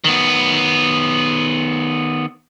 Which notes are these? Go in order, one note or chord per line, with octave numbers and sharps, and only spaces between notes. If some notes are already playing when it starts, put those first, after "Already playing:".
D#3 B3